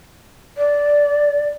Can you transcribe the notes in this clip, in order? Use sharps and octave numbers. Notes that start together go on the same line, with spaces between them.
D5